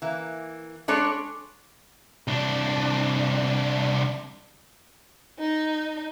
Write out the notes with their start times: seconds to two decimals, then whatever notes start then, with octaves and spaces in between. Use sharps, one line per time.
0.02 E3 A#3
0.88 G#3 D4 A4 C#5
2.28 C2 D4
5.39 D#4